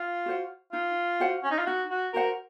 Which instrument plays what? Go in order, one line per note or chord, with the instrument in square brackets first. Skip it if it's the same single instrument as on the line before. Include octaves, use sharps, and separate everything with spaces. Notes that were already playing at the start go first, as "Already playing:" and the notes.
Already playing: [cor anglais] F4
[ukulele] F#4 C5 F#5
[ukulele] D#4 [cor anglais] F4
[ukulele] F#4 C5 F#5
[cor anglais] C#4
D#4
F4
[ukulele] D#4 [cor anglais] F#4
[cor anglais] F#4
[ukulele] F#4 C5 F#5 [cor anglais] A#4